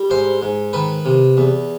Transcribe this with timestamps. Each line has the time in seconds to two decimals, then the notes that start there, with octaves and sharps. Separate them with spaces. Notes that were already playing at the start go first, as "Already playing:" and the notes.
Already playing: G3
0.10 G#2 C5 C6
0.42 G#2
0.73 D#3 B4 B5
1.05 C3
1.37 E2